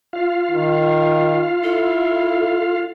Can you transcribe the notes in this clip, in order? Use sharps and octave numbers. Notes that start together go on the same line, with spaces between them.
F4 F5
D#3
E4 A4